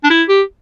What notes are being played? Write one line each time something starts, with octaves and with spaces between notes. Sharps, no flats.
D4
E4
G4